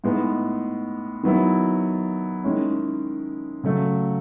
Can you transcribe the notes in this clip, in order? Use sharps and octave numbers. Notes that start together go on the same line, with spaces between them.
A2 G#3 B3 D#4
D#3 F#3 B3 E4
D#3 G#3 C#4 E4
C#3 F#3 A3